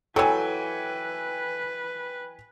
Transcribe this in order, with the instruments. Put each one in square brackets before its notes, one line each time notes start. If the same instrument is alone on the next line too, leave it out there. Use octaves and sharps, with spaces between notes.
[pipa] E3 F#3 [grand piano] A4 [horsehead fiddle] B4 [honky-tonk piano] G5 G#5